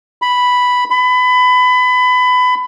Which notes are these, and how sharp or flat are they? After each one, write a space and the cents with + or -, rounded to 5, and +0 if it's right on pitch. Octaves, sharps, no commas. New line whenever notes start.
B5 +0
B5 +25